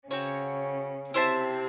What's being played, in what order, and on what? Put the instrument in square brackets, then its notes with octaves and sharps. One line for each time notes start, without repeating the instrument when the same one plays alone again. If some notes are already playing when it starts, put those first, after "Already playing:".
[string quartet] C#3 C#4 [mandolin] C4 F#4 C#5
[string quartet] C3 C4 [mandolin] E4 C5 E5 A5